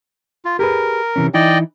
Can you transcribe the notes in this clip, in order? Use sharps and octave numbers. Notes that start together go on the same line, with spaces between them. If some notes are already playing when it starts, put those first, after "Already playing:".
F4
G4 G#4 A#4 B4
C3 E3 C#4
E3 D#4 E4 D5 D#5 G5